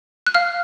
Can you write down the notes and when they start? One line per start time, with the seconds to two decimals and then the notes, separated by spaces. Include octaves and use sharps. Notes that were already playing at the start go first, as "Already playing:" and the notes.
0.27 F#6
0.34 F5 F6